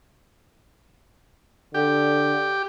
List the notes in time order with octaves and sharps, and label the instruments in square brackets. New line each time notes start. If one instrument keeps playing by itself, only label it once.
[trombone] D3 [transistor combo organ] G4